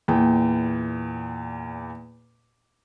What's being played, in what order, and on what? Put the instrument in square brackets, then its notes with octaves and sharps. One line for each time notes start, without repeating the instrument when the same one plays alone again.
[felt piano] E2 A#2 G5